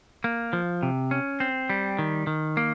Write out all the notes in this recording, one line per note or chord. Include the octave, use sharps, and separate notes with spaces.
A#3
F3
C3
C#4
C4
G3
D#3
D#3
A#3